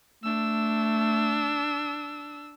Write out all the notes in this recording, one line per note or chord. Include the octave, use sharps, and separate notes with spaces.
A3 D4 E6